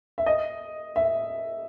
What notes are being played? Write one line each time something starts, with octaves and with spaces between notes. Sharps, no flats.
E5
D#5
E5